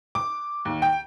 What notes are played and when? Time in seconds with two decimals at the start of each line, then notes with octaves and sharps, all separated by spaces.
0.15 D6
0.65 D#2
0.82 G5